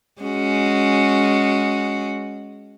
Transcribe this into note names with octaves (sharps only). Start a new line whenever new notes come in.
G#3 C#4 F#4